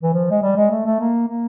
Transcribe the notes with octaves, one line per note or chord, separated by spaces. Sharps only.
E3
F3
G#3
G3
G#3
A3
A3
A#3
A#3